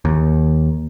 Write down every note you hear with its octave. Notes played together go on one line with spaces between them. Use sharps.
D#2